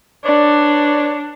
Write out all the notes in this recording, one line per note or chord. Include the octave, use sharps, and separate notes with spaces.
D4 B4 C#5 D5